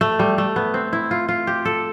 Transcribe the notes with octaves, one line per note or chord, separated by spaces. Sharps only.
A3
G3
A3
B3
C4
E4
F4
F4
G4
A4